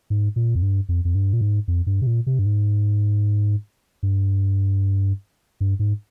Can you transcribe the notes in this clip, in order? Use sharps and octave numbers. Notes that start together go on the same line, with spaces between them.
G#2
A#2
F2
G2
F2
F2
G2
A#2
G#2
F2
G2
C3
A#2
C3
G2
G#2
G2
G2
G#2